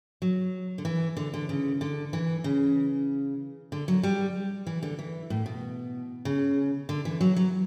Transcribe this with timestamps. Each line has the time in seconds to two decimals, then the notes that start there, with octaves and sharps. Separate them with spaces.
0.22 F#3
0.78 D3
0.85 E3
1.17 D3
1.34 D3
1.49 C#3
1.81 D3
2.13 E3
2.44 C#3
3.72 D3
3.88 F#3
4.03 G3
4.67 E3
4.83 D3
4.99 E3
5.30 A2
5.46 B2
6.25 C#3
6.89 D3
7.05 E3
7.21 F#3
7.36 F#3